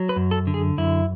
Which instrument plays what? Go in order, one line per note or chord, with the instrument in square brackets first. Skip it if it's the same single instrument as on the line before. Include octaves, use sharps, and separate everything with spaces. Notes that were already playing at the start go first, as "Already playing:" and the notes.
Already playing: [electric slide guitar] F#3
B4
F#2
A4
D3
G#4
F#2 E4